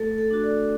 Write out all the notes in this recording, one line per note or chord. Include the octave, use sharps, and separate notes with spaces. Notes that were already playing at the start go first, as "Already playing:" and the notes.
Already playing: A3 A4
A4
D4 F#4
A4 D5